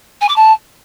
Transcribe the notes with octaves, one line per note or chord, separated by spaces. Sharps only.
G#5
D6
A5